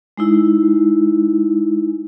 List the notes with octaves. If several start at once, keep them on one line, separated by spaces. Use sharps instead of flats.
G#3 D#4 E4